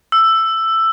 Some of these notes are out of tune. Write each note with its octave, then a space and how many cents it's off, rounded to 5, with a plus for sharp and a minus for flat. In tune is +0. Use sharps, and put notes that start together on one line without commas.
E6 +10